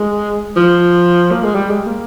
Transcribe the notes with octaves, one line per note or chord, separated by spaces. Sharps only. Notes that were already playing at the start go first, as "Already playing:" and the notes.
Already playing: G#3
F3
A#3
G#3
G3
G#3
A#3